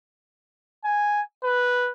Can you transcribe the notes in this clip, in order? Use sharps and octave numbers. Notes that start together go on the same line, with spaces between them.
G#5
B4